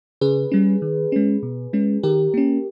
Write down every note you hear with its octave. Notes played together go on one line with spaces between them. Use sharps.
C#3 G#4 B4
G3 C#4
D#3
G#3 C#4
B2
G#3 C#4
D#3 G4 A#4
A#3 C#4